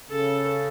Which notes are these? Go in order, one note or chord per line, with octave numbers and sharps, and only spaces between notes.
C#3 A4